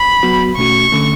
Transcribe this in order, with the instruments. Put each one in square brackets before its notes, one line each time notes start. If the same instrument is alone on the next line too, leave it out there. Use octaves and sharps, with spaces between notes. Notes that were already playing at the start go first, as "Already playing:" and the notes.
Already playing: [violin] B5
[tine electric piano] F#3 B3 F#4
[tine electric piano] B2 A3 C#4 F#4 [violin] C#6
[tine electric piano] D3 A3 C#4